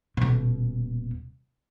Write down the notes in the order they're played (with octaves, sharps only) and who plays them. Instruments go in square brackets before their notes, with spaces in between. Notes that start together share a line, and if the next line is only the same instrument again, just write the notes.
[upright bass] D#1 B2